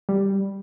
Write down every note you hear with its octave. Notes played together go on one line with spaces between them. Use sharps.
G3